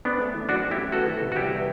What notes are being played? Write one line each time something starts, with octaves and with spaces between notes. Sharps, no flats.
B3 C4 D4
A3
E3
F#2 D4 F#4
C4
E4 G4
A3
B3 F#4 A4
E3
C3
F#4
C2 E4 G4
B3